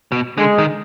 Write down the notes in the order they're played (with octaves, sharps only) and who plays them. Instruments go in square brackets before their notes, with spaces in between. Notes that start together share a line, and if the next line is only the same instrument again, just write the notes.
[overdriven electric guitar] B2
[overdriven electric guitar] D3 [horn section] G#3
[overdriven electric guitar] D#3